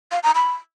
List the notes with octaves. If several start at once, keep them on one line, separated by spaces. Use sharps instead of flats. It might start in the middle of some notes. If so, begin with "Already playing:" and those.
F5
A#5
B5